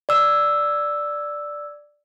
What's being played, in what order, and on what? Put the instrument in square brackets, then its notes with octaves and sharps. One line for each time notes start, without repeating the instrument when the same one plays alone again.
[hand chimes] D5 E6